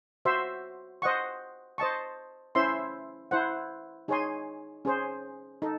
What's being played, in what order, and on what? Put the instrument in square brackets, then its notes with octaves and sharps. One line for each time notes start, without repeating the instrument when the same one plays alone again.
[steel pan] F#4 C5 E5 C6
C5 D#5 F#5 C#6
C5 D#5 A5 C#6
C#4 E4 C5 E5 C6
E4 C5 F#5
D#4 G#4 C#5 G#5 C6
C#4 G#4 C5
D#4 A4